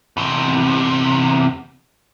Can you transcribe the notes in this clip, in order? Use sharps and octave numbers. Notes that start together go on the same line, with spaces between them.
E2 C3